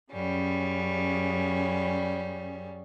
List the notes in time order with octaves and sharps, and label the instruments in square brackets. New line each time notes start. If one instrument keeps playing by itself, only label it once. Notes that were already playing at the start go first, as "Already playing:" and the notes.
[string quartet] F#2 C#3 G3 C#4